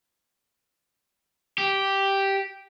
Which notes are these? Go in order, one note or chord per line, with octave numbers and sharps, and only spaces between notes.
G4